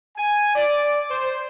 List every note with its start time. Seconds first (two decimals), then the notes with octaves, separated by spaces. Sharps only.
0.17 G#5
0.54 D5
1.11 C5